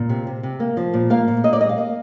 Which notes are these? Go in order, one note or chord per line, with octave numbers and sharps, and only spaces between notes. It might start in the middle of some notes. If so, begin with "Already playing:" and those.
Already playing: A#2
C3
C3
C3
A#3
F3
A#2
A#3 F5
A#2
A#3 D#5
D5
G3 D#5
F5
A#3